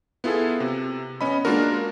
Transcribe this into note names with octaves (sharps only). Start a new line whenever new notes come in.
B3 E4 F4 G#4 A4
C3
B3 C#4 D#5 B5
G#3 A#3 D4 F4 F#4 A#4